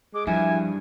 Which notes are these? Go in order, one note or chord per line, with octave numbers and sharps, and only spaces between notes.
G#3 D6
G2 F3 E4 G#5